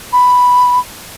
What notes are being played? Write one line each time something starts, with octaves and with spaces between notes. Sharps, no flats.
B5